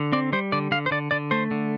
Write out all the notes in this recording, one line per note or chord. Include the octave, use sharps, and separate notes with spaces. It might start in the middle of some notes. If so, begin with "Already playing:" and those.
Already playing: D3
C4 D5
G3 C5
D3 D5
D3 F5
C5
D3 D5
D3 D5
A3 C5
D3